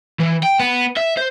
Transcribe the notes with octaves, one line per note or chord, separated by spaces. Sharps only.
E3
G5
B3
E5
C5